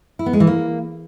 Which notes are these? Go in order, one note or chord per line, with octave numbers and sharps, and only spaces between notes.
E4
B3
G#3
E3
A#3